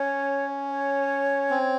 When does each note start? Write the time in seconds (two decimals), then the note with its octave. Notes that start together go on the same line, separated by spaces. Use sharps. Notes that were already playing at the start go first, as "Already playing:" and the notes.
Already playing: C#4 C#5
0.70 C#5
1.50 C4